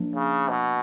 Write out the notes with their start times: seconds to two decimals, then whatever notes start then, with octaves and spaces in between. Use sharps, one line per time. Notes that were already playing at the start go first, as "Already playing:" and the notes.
Already playing: F3 A#3 D4
0.15 C#3
0.49 B2